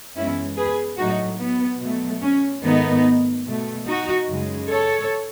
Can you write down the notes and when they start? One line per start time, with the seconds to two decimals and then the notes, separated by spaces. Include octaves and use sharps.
0.16 F#2 E3 G#3 B3 C#4 E4
0.57 G#4 B4
0.98 A2 F#3 A3 D#4 F#4
1.39 B3
1.81 B2 F#3 A3
2.22 C#4
2.63 G#2 D#3 A3 B3 D#4
3.45 B2 A3
3.86 D#4 F#4
4.28 F#2 C#3 G#3
4.68 A4 C#5